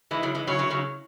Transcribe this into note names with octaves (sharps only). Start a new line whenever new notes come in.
E3 G#3 E4
C#3 F#3
E3 G#3
C#3 F#3 C#5
C#3 F#3
C#3 F#3